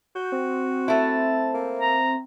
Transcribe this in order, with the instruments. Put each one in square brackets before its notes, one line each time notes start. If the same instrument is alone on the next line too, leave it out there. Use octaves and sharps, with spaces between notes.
[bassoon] F#4 [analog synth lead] G6
[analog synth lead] C4
[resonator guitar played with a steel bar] A3 E4 [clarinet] A5
[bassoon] A#3
[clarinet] A#5